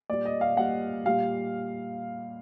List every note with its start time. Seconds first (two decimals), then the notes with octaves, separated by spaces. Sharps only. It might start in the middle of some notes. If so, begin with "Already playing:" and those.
0.10 A#2 G3 D5
0.25 D#5
0.41 F5
0.57 A#2 G3 F#5
1.06 A#2 G3 F5